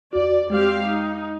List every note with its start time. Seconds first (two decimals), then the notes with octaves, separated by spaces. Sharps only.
0.13 E2 F#4 D5
0.50 G#3 C4 G4 F5
0.82 D#4